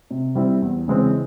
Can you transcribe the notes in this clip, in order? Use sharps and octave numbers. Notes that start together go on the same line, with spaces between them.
C3
G3 C4 E4
E2
C#3 E3 G#3 C4